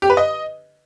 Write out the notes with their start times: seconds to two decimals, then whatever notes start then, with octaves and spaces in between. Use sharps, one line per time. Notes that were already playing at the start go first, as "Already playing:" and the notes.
0.02 G4
0.10 B4
0.17 D#5